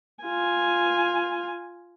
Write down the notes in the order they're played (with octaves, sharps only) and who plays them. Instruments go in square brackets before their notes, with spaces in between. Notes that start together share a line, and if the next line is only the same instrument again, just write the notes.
[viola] F4 G#5